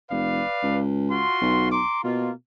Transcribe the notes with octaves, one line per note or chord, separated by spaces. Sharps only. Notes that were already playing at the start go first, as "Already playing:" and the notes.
F1 B4 D5 F5
C#2
F4 F#4 C6
B1
A#5 C6 D6
B2 A#3 F4